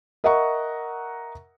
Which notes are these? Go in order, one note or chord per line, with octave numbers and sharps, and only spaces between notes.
A#4 D#5 E5 F#5 A#5 C#6